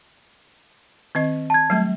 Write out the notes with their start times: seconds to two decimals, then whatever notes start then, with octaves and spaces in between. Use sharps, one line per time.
1.15 D#3 C4 D#5
1.50 A5 G#6
1.70 F#3 G3 A3